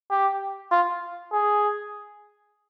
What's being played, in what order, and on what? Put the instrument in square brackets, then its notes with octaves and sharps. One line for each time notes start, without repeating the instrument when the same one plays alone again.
[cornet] G4
F4
G#4